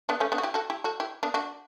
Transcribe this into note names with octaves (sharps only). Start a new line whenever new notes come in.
B3 D4
A3 C#4
B3 D4
F#4
E4 G4
F#4 A4
E4 G4
F#4 A4
E4 G4
B3 D4
D4 F#4